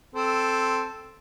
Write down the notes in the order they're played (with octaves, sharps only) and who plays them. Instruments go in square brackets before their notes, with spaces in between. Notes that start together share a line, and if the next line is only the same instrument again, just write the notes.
[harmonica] C4 A4